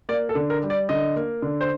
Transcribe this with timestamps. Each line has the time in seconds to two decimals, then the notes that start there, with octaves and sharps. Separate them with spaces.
0.09 A#3 D5
0.29 A4
0.35 D3
0.50 A#4
0.63 G3
0.70 D5
0.89 D3 D#5
1.16 A#3
1.42 D3
1.61 C5